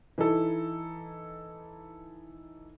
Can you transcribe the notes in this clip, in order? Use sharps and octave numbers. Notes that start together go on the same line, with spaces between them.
E3 D#4 E4 A4